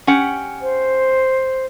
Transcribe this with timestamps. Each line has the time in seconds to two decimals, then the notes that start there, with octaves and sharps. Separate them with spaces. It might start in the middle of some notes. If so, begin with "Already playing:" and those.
0.07 C#4 G4 F#5
0.62 C5